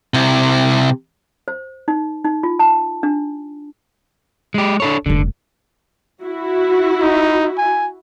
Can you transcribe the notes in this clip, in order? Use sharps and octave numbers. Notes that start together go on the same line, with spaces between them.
C3 E4
C5
D#4
D#4
F4
A5
D4
G#3 G4
D4 A4 C#5
F1 G2 D3
E4 F#4
D#4
G#5